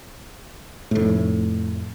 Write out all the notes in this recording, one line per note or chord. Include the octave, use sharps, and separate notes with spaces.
F1 A2